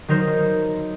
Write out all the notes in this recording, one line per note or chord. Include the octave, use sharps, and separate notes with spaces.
D#3 F#3 D#4 A#4 C5